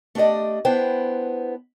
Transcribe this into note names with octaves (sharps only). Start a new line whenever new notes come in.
A3 D4 G4 D5 D#5
B3 D4 E4 C5 G5